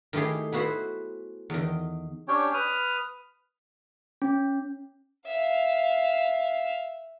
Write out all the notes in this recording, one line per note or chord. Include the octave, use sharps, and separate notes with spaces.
D#3 A3 E4 G4 G#4
B3 E4 F#4 B4 C5
E2 D#3
C#4 D4 G4 C#5 G5
B4 D#6 F6
C#4
E5 F5